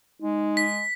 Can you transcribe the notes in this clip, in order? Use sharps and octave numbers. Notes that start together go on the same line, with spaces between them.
G#3 D#4
B6